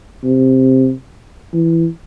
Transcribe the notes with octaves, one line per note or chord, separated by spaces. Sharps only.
C3
E3